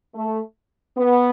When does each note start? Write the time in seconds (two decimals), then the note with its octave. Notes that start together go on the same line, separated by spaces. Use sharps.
0.15 A3
0.97 B3